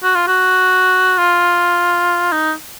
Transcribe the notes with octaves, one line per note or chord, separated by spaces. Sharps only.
F#4
F4
F#4
F4
D#4